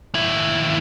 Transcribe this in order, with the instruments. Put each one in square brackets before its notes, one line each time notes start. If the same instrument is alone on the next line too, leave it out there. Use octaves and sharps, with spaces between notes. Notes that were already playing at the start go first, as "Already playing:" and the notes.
[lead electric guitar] D#2 E4